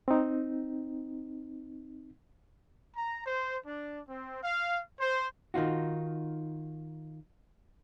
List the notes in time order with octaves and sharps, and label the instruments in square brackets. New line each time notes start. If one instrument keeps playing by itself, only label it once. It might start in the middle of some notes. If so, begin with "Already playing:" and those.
[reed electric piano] C4 D#4
[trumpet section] A#5
C5
D4
C4
F5
C5
[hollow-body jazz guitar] D#3 D#4 F4 F#4